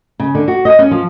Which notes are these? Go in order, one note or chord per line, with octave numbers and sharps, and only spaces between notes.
C#3
D3
F#4
D#5
C#4
F3